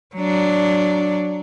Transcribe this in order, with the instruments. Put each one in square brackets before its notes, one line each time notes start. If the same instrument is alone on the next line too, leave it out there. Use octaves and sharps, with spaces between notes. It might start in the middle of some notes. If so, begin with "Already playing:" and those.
[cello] F#3 D4